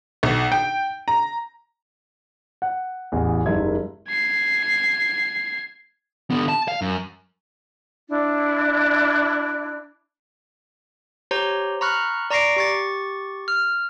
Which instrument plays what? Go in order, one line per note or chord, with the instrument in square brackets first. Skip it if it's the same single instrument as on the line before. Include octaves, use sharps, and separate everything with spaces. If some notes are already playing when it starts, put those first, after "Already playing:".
[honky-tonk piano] B1
G5
A#5
[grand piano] F#5
A1 E2
F#1 G#2 G3 A#4 E5 G#6
[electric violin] G#6 C7
[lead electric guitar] D3 B3
A5
F5
F#2
[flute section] D4 E4
[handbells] G4 C5 C#5 A#5
A#5 B5 C#6 F6 F#6
D5 A#5 C#6 A#6 C7 D7
G4 C#6 A6
F6